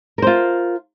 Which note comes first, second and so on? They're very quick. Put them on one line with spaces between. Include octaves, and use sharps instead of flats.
A#4 C5 F4